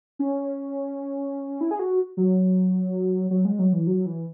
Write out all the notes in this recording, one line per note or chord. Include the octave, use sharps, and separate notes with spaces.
C#4
E4
G#4
F#4
F#3
F#3
G#3
F#3
E3
F#3
E3